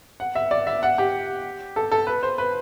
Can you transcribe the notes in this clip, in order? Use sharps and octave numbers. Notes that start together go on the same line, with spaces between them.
F#5
E5
D5
E5
F#5
G4
A4
A4
B4
C5
B4